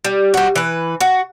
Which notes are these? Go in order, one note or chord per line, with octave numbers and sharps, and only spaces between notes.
G3
G3 F#4
E3 B4
F#4